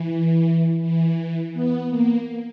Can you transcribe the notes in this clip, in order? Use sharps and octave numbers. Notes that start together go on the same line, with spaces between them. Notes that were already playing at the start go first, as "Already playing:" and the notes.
Already playing: E3
E3
B3
A#3